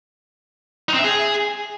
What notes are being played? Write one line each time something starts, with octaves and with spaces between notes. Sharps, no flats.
D#4
C4
E5
G#4